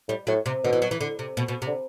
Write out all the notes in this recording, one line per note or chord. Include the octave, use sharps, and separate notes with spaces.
A2 G3
A2 F#3
C3
B2 D3
E3
F#3
E3
D3
C3
B2
B2
C3
D3